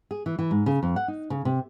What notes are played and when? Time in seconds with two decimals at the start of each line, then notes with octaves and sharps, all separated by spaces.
0.11 G#4
0.26 E3
0.39 E3
0.51 G#2
0.66 C#3
0.83 F2
0.96 F#5
1.08 D#4
1.30 C#3
1.45 C3